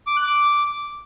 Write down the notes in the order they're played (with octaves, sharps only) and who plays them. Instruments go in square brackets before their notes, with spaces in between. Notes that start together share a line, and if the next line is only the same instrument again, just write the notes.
[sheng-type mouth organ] D6
F#6
D6